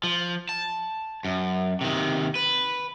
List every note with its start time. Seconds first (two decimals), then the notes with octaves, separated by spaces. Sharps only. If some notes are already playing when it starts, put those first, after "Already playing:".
0.04 F3
0.49 A5
1.25 F#2
1.81 C3 D#3
2.35 B4